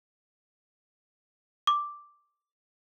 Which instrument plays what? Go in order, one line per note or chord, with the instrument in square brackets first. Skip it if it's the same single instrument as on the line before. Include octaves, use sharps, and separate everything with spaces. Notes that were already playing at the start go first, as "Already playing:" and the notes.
[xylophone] D6